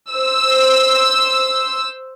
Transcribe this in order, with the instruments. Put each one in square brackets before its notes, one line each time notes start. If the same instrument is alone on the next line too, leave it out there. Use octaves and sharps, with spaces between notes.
[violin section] C5 E6